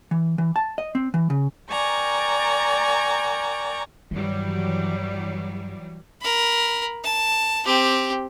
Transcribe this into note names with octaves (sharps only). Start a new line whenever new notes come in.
E3
E3
A5
D#5
C4
E3
C#3
A#4 D5 G5 G#5 A#5 C#6
G2 D#3 E3 F#3 G3
A#4 B5
A5
C4 G4